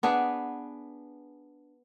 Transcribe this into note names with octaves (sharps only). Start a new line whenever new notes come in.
B3 D4 G#4 B4